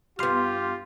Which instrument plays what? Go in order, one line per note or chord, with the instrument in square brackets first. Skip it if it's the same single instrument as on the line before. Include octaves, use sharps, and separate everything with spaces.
[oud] G2 B3 [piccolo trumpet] F4 [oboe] G4 [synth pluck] C6 F6